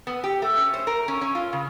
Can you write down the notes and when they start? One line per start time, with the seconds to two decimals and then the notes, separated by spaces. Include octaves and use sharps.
0.07 B3
0.24 G4
0.42 A3
0.57 C#4
0.74 C5
0.87 A#4
1.08 C#4
1.21 C#4
1.35 F4
1.53 C#3